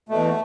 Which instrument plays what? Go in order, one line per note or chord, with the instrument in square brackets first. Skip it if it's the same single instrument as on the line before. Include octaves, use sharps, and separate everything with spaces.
[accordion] E2 B2 A3